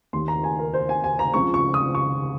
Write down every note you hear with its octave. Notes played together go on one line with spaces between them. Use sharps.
D#2 D#3 A#3 C6
A#5
G#5
A#4
C5
G#5
G#5
A#5
C#2 C#3 F3 C4 C#6
C#6
D#6
C#6